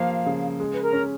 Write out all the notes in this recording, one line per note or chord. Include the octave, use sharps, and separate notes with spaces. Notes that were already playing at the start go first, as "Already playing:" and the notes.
Already playing: F3 A#3 F5
C#3
G#3
B4
A#4
C#4